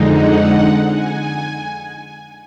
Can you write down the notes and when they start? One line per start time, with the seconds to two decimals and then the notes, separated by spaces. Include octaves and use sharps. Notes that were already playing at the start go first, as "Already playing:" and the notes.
Already playing: F2 D3 G#3 D#4
0.11 F#5
0.92 G#5